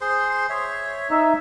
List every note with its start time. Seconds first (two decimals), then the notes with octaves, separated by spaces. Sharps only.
0.01 G#4 C5 C6
0.49 C#5 E5
1.11 D#4 E5